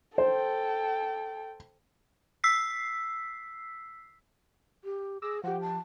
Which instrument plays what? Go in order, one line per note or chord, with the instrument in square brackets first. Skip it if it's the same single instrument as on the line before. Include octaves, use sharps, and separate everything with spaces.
[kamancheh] A4 G5 [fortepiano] C5
[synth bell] E6 B6 C7
[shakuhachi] G4
[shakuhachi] G#4 [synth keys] D6 E6 A#6
[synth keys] F3 G4 [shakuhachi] F#5
[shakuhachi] A5